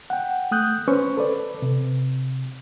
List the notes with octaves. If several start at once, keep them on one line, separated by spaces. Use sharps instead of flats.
F#5 G5
A3 D#6 F#6 G6
C#4 B4 C5 C#6
A4 B4 D5
C3